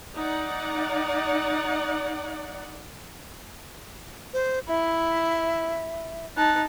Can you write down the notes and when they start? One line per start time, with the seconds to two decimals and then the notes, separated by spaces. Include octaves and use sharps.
0.14 D#4 D5 F#5
4.33 C5
4.68 E4 E5
6.37 D#4 A5 F#6